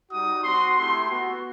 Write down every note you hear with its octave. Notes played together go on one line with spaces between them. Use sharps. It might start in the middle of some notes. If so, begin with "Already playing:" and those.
G3 D#4 F#4 D#6
C4 F#4 C6
A3 E4 G4 C6
B3 F#4